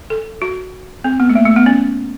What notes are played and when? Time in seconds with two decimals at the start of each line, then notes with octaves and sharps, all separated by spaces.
0.10 A4
0.42 F#4
1.04 C4
1.20 B3
1.29 A3
1.35 A#3
1.46 A3
1.56 B3
1.66 C#4